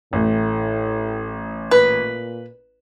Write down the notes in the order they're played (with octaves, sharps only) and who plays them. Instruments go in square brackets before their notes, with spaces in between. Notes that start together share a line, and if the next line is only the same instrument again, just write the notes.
[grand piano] A1 [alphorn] A2
[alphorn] A#2 [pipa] B4